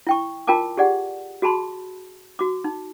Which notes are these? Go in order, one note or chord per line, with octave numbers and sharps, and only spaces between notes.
E4 G5 C#6
F4 A#4 G5 A5 D6
G4 G#4 D5 F#5
F#4 G#4 A5 B5 C6
F#4 D6
D#4